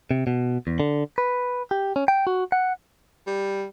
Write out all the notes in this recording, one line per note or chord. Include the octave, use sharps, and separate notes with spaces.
C3
B2
E2
D3
B4
G4
C#4
G5
F#4
F#5
G3